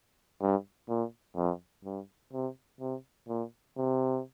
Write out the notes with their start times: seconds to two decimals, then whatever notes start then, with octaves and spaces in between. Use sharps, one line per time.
0.41 G2
0.89 A#2
1.36 F2
1.85 G2
2.33 C3
2.80 C3
3.28 A#2
3.77 C3